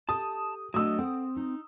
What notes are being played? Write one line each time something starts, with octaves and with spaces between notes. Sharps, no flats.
G4 A4 A5 D#6
F#3 A3 D4 F#4 D#5 D#6 E6
C4 A4 F#5
D#4